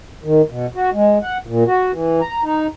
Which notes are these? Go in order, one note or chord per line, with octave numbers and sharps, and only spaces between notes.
D#3
B2
F#4
G#3
F#5
A#2
F#4
E3
A#5
D#4